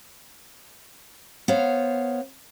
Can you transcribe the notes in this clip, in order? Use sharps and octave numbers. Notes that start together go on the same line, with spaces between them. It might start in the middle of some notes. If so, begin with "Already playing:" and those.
B3 C5 C#5 F5